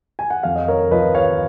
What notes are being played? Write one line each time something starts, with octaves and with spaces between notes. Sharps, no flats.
G#5
F#5
F2 F5
D#5
A#4 C#5
F3 B4 D#5
C#5 F5